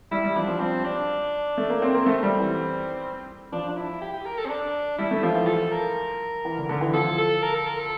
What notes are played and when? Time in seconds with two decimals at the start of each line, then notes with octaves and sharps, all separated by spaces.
0.11 G3 E4
0.24 G3
0.36 F3 D4
0.48 F3
0.60 G3 C4
0.85 D4
1.57 A3
1.70 A#3
1.82 C4
1.94 A#3
2.06 A3 C4
2.23 G3
2.39 E3
3.52 F3 D4
3.69 D4
3.77 E4
4.02 G4
4.13 G4
4.25 A#4
4.37 A4
4.45 C4
4.50 D4
4.98 G3 E4
5.11 A3
5.23 F3 F4
5.36 E3
5.47 A4
5.71 A#4
6.45 E3
6.57 D3
6.69 D3
6.81 E3
6.93 F3 A4
7.18 A4
7.42 A#4
7.54 A4
7.66 A#4
7.79 A4